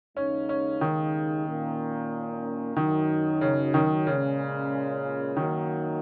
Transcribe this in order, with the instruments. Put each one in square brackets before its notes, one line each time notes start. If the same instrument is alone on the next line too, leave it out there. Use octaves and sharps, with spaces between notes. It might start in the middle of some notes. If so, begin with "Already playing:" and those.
[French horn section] D#2 C#3 G#3 D#4 [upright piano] C#4
[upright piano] C#4
D#3
[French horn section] A#2 A#3 C#4
[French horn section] F#2 F#3 D#4 [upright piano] D#3
[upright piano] C#3
D#3
[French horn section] A#2 G#3 C#4 [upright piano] C#3
[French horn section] F#2 F#3 A#3 D#4 [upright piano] D#3